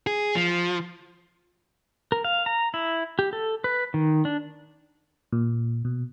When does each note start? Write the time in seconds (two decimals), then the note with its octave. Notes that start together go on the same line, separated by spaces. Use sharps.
0.07 G#4
0.35 F3
2.12 A#4
2.24 F5
2.46 A#5
2.74 E4
3.19 G4
3.33 A4
3.64 B4
3.94 D#3
4.25 D4
5.32 A#2
5.85 B2